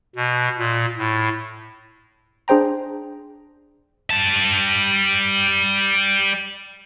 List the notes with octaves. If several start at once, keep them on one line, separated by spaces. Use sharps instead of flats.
B2
A#2
A2
D4 G#4 C5 G5 A#5
G3 A5